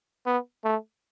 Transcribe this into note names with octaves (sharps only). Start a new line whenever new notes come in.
B3
A3